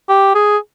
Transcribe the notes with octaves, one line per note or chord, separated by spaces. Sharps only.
G4
G#4